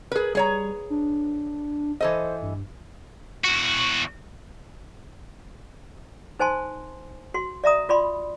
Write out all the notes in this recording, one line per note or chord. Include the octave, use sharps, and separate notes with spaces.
G#4 A#4 B4
G3 G#4 C#5 A#5
D4
E3 A4 C5 D#5
G2
E2 F#4
D#4 C5 G#5 A5 C6
F#4 C6
D5 E5 A#5 D#6
F4 D5 B5 C6